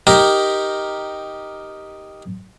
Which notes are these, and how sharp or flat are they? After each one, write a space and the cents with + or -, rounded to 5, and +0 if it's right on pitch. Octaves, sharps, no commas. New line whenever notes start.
D#4 +0 G4 +0 A#4 +0